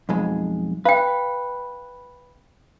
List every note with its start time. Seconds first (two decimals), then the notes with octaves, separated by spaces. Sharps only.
0.09 B1 F2 G#3
0.85 B4 F5 G5